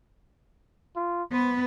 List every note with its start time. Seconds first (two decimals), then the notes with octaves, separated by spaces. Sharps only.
0.96 F4
1.32 B3 B4 C5